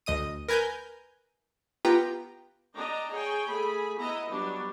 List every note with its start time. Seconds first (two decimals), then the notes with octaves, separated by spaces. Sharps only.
0.06 D2 D#5 D#6 D#7
0.48 A#4 B4 G#5 A#5 G6
1.85 B3 F4 G4 B4 G5 A#5
2.75 D4 D#5 G5 A#5
3.12 G#4 C#5 G5
3.48 A3 G#4 B5
3.98 B3 E4 D#5 A#5
4.30 F#3 G3 B3 D4